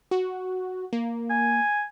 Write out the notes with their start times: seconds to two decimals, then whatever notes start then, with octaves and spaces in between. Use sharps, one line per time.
0.11 F#4
0.93 A#3
1.30 G#5